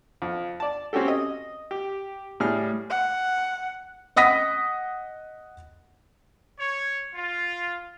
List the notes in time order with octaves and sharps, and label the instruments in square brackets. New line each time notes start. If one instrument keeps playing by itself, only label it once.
[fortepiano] F2
D5 A5
C4 C#4 F#4 G4 A4
D#5
G4
A2 G3 G#4 F6
[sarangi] F#5
[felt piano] D#5 F#5 D#6 A#6 B6
[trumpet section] C#5
F4